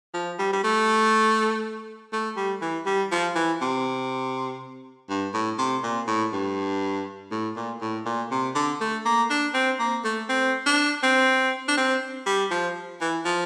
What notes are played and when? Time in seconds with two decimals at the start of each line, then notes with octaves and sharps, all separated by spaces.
0.14 F3
0.39 G3
0.53 G3
0.64 A3
2.13 A3
2.37 G3
2.62 E3
2.86 G3
3.12 F3
3.35 E3
3.61 C3
5.10 G2
5.34 A2
5.58 C3
5.83 A#2
6.07 A2
6.33 G2
7.31 A2
7.56 A#2
7.81 A2
8.05 A#2
8.31 C3
8.55 D3
8.81 A3
9.05 A#3
9.30 D4
9.54 C4
9.79 A#3
10.04 A3
10.29 C4
10.66 D4
11.03 C4
11.68 D4
11.77 C4
12.26 G3
12.51 F3
13.01 E3
13.25 F3